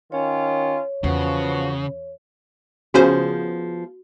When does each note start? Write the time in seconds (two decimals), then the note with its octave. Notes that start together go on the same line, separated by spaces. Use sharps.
0.12 D#3 C#4 F4 C#5
1.04 E2 C#3 F3 B3 F#4
2.94 C#3 F3 B3 C#4 F#4 G#4 C5